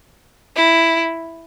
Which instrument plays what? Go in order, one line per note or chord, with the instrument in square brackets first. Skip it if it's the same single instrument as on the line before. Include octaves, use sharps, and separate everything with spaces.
[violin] E4